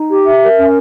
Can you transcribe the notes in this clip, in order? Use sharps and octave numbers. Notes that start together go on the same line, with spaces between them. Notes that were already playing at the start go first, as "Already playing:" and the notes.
Already playing: D#4
G4
E5
A#4
C#4